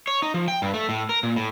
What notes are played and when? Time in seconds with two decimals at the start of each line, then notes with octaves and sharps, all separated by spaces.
0.07 C#5
0.22 D#4
0.34 F3
0.48 G5
0.62 G2
0.74 A3
0.89 A2
1.09 A#4
1.23 A#2
1.36 A2